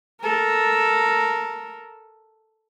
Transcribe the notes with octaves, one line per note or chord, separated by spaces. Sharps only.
A4 A#4